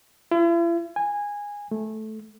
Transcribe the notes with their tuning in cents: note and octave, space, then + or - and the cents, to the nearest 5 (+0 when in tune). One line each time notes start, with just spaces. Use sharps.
E4 +45
G#5 -15
A3 -15